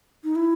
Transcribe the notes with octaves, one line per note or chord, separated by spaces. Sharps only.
D#4
E4